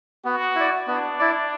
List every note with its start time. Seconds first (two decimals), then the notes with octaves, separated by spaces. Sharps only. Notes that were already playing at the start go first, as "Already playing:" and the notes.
0.25 B3 F#4
0.56 E4 D5
0.87 B3 D4
1.19 E4 D5